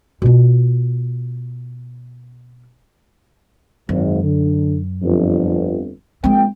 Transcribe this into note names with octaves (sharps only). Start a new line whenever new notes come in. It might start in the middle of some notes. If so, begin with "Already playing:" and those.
B2 F4
G#1 F#2
D3
G1 F2
A#1 G#3 C4 G5